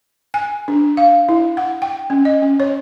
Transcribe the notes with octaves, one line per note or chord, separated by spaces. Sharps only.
G#5
D4
F5
E4
F#5
G5
C#4
D#5
C#4
C#5